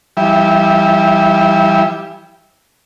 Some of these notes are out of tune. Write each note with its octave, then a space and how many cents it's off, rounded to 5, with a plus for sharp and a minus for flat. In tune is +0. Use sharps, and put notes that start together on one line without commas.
E3 +45 G3 +0 E4 -25